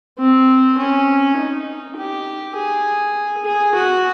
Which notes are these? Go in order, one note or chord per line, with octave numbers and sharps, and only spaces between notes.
C4
C#4
D#4
G4
G#4
G#4
F#4